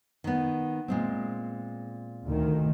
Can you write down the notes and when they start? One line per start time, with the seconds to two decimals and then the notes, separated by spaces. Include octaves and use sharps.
0.24 D#3 B3
0.88 A#2 G#3 C4
2.24 D2 D#3